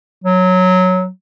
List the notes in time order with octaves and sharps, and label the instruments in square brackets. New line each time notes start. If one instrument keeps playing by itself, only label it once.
[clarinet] F#3